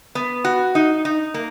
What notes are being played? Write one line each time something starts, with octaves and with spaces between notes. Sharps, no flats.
B3
F#4
D#4
D#4
A#3